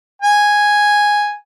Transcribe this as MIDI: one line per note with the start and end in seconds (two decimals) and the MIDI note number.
0.22 1.35 80